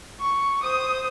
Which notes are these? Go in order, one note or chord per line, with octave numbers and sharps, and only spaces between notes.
C#6
C5 D#6